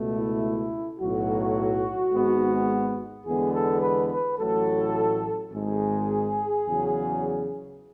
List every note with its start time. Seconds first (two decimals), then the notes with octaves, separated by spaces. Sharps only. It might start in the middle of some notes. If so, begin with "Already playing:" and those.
Already playing: C#2 B2 A3
0.14 E4
0.99 B1 A2 F#3 F#4
2.12 G#1 G#2 G#3 B3
3.25 E2 D3 G#3 B3 G#4
3.54 A4
3.81 B4
4.10 B4
4.38 A1 A2 F#3 A4
5.51 G#1 G#2 G#3 G#4
6.65 E2 C#3 F#3